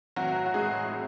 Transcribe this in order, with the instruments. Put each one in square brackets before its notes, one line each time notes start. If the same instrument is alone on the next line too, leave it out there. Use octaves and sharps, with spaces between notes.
[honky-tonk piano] A2 E3 F#3 F#4
F#4
A2 E3 G#3 G#4
A2